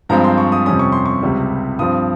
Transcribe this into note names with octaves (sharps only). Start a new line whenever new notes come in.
G2 F3 G#3 C4 A#5
C6
C#6
D#6
F2 C3 G3 C#4 D#6
C#6
C6
C#6
C#2 C3 G3
G2 F3 C4 D#6